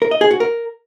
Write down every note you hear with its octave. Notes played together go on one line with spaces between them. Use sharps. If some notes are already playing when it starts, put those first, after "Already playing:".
A#4
D#5
G#4
F#4
A#4